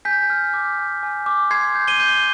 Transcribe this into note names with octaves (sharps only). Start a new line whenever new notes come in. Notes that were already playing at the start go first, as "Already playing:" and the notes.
G#5 G6 B6
F6
D6
G#5
G#5
D6
C6 G#6 C7
G6
D#7 G7
G6